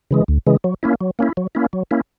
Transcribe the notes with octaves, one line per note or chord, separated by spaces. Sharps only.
C#3 E3 G#3
D2
C#3 E3 G#3
F#3
A#3 C#4 E4
F#3
A#3 C#4 E4
F#3
A#3 C#4 E4
F#3
A#3 C#4 E4